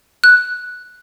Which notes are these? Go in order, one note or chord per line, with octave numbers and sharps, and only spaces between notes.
F#6